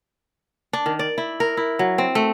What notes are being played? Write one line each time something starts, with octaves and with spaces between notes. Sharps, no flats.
D4
D#3
D5
E4
A#4
E4
F#3
C4
A3